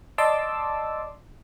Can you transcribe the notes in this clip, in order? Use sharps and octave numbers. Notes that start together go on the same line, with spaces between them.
D5 D#5 A5 C6 D6 E6